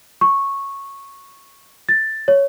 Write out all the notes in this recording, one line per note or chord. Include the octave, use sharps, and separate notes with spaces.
C#6
A6
C#5